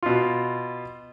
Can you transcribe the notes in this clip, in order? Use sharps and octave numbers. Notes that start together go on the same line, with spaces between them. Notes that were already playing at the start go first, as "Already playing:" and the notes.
B2 F4